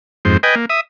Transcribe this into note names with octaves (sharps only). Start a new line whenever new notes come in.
F2 G#2 C5
B4 D#5 G5 G#5
A#3
E5 D#6